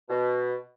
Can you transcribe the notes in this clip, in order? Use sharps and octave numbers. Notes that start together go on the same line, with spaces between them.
B2